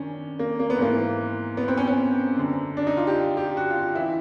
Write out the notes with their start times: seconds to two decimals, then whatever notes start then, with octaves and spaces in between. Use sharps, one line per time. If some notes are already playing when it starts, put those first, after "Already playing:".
Already playing: F#2 D#3 C#4 D4
0.39 A#3
0.59 A#3
0.70 B3
0.78 G#2 E3 A#3
1.57 B3
1.68 C4
1.77 C#4
1.87 C#4
2.37 F#2 D3
2.77 D4
2.87 D#4
2.97 F4
3.07 G4
3.37 G4
3.57 F#4
3.70 F4
3.95 E3 E4